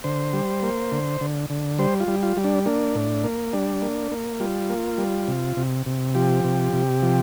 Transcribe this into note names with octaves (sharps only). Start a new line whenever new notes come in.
D3 C5
G3
A#3
D3
D3
D3
G3 C5
F4
G3
F4
G3
D4
A#3 D4
A2
A#3
G3 D4
A#3
A#3
G3 F4
A#3
G3
C3
C3
C3
F3 G4
C3
C3
F3